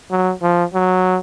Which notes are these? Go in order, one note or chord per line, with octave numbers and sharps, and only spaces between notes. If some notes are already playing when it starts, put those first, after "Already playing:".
F#3
F3
F#3